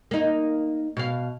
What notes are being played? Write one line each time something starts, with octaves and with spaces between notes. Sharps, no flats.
A#3 D#4
B2 F5